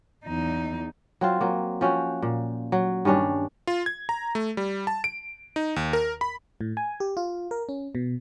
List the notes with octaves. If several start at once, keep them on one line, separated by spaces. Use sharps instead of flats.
E2 D#4
F#3 C4 F4
F#3 A#3
F3 C#4 F#4 G5
A#2
F#3
G2 D#3 C#4 D4
F4
G#6
A#5
A3
G3
A5
D7
D#4
D#2
A#4
B5
A2
G#5
G4
F4
A#4
C#4
B2